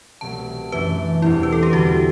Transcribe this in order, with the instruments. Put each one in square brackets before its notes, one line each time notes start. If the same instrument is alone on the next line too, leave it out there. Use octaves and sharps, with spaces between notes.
[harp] C2 B2 F#3 A3 [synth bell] A5
[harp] F#2 E3 A3 D4 [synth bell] B4
[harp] E2 B2 G3 C4 [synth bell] E4
[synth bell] B4
A4
G4
[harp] E2 D3 G3 [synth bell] F#4